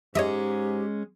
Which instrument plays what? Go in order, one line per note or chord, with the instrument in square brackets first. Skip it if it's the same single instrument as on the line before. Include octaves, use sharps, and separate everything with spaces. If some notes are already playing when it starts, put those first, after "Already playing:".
[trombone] G#2 [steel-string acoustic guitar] G#3 C#4 [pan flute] G4 [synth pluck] C#5 D#5 E5